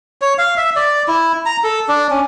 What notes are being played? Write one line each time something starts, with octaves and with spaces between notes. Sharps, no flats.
C#5
F5
E5
D5
E4
A#5
A4
D4
C#4